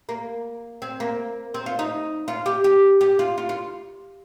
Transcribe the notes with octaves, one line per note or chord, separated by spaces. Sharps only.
A#3
C4
A#3
C4
F4
D#4
F4
G4
G4
G4
F4
F4
F4